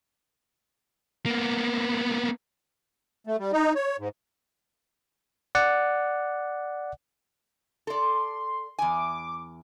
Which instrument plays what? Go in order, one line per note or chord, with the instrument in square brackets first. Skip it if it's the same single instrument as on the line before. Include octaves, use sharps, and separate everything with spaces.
[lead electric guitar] A#3 B3
[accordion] A3
G3
D#4
C#5
G#2
[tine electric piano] D5 F#5
[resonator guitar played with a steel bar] A4 D5 [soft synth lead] C6
[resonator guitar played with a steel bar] E2 G#5 [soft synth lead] D6